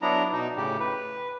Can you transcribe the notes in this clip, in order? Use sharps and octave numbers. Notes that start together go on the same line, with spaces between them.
F#3 B3 D4 E4 A#5
B2 D#4
A2 C#3 G4
B4